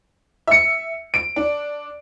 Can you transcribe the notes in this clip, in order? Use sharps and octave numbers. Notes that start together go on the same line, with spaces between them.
E5 C#7
D7
D4